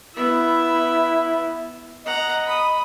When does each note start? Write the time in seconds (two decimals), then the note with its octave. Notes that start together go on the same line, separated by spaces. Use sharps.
0.14 B3 E4 E5
2.06 D#5 F#5 A#5
2.46 B5 D#6